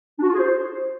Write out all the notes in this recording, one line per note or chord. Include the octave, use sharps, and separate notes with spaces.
D4
F#4
F4
G#4
C5